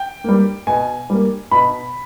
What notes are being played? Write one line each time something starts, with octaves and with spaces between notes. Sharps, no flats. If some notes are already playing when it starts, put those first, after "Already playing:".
Already playing: G5
G3 A#3
B2 G#5
G3 A#3
B2 B5